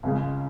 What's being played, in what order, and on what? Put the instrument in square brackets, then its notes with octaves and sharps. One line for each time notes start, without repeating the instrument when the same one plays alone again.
[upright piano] C#2 C#3 G#3